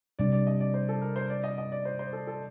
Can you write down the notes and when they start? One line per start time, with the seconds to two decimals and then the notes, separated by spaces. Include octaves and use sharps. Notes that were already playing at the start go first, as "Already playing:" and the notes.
0.19 C3 G3 D4 D5
0.32 D5
0.47 D#5
0.60 D5
0.74 C5
0.89 A4
1.01 A#4
1.16 C5
1.30 D5
1.44 D#5
1.58 D#5
1.72 D5
1.85 C5
1.99 C5
2.13 A4
2.27 A4